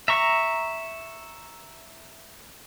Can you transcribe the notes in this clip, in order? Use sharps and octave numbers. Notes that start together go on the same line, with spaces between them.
E5 A#5 C#6